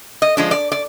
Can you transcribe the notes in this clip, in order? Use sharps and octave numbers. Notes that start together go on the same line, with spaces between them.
D#5
F3 G#3 D4
D5
D5